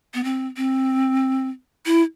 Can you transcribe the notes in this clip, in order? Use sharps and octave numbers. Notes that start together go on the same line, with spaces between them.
B3
C4
C4
E4